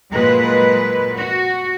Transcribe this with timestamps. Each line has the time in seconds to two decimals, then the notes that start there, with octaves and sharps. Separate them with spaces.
0.12 A#2 F#3 G#3 B4
1.15 F#4